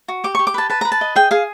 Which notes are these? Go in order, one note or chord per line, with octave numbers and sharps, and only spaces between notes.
F#4
G4 D6
G4 C#6
D6
B4 A5
B4 A5
B4 A#5
A5
D#5
G#4 G5
G#4 F5